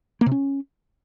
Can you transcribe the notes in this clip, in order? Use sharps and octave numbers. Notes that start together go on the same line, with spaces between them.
A#3
C3
C#4